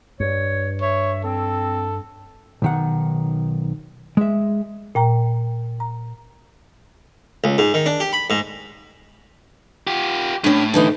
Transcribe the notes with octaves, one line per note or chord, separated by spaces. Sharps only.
G2 C#5
C#5 E5
C4 A4
B1 D#3 F#5
G#3 E5
A#2 G5 A#5
A#5
C#2
G#2
D#3
D4
G4
B5
G#2
F4 G4
A2 C#4 D4
D3 E3 D#4